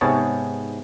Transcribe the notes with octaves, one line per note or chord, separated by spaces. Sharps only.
G#2 C3 B3 G#4 C#5 A5